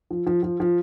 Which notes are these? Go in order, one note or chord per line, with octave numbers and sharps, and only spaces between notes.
F3
F3
F3
F3